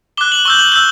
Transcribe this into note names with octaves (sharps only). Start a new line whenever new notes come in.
D6 F#6 G7
F#7
C#6 E6 G6 G7
F#7
E6 G6 G7